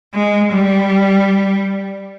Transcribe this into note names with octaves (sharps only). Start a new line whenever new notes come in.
G#3
G3